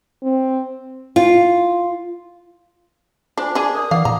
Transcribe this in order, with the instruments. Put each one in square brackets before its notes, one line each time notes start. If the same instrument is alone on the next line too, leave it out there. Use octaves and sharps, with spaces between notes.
[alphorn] C4
[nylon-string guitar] F4
[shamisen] D4 [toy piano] F4 C5 G#5
[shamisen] D4 G#4
[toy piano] A#4 D5 [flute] D#6
[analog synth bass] E3 [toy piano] D5 F#5 D6 [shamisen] F5
[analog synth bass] A#2 [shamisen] A#5